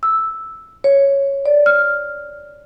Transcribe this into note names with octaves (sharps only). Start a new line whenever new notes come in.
E6
C#5
D5
F6